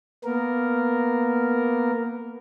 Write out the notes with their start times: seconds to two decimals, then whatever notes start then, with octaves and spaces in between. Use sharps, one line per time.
0.24 A#3 B3 A#4